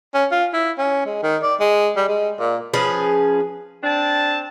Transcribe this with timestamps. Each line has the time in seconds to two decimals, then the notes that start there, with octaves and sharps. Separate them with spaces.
0.14 C#4
0.31 F4
0.53 E4
0.78 C#4
1.06 G#3
1.23 D#3
1.43 D5
1.60 G#3
1.96 G3
2.08 G#3
2.40 A#2
2.74 F3 C#4 G#4 B4
3.82 C4 D4 A5